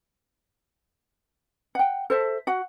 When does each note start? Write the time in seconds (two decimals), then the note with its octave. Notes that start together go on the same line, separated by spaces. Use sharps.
1.75 F#5 G5
2.10 A4 C5 E5
2.47 F#4 F#5